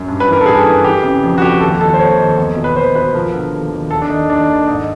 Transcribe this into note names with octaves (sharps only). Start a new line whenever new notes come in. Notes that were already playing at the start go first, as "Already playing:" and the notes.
Already playing: F#2
G2
B4
E3
A#4
A4
G2 G#4
E3
E3 G4
C#3
F2
F#4
F2 G4
D#2 A4
D#3 A4
C5
D#2 C#5
D#3
E2
B2
B4
E2 C5
B2 B4
F3 A#4
D3
D#2
D#2
D#2 A4
D4
D#3 D#4
D#2 D4
D#3
G#2 D#4